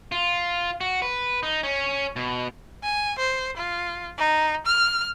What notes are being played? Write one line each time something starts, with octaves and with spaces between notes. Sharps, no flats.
F4
F#4
B4
D#4
C#4
B2
G#5
C5
F4
D#4
F6